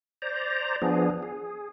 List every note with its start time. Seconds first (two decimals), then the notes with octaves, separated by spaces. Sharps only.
0.22 C5 D5 A#5
0.82 F3 B3 D4 G#4
1.22 G#4